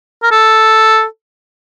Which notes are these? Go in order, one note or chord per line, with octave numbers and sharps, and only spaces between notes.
A#4
A4